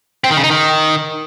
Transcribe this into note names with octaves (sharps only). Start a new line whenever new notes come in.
C4
D#3
C#3
D#4
D#3